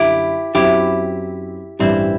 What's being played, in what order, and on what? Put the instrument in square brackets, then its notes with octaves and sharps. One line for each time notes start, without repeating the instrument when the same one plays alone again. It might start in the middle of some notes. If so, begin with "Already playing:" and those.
Already playing: [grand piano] F#2 D3 G3 [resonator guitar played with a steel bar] E4 G4
[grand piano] F#2 F#3 C4 [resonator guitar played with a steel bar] E4 G4
[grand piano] A1 G2 E3 G3 [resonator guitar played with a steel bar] C4 E4